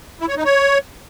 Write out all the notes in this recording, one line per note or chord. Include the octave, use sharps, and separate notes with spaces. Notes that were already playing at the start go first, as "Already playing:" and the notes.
E4
C#5
D#4
C#5